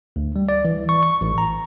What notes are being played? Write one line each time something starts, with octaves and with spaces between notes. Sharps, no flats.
D2
G3
D5
E3
C#6
C#6
A1
A#5